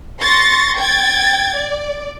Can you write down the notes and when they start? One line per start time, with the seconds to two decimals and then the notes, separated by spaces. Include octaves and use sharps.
0.19 C6 C#6 A6 A#6
0.78 G5 G#6 A6
1.55 D5